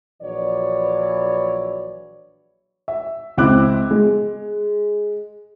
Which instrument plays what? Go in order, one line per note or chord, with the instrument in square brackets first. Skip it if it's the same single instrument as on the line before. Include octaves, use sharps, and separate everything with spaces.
[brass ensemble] A#1 E3 F#3 C#5 D5
[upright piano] E5
C#2 C4 E4 D6 F#6
G#3